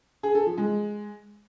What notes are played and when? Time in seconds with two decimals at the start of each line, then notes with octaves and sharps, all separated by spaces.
0.23 G#4
0.35 A4
0.46 F3
0.57 G#3